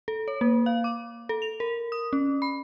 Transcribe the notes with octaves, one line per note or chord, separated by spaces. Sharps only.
A4
C#5
A#3
F5
D6
A4
F7
A#4
D#6
C#4
B5